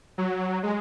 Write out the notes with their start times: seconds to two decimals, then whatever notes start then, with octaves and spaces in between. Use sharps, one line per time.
0.18 F#3
0.63 G#3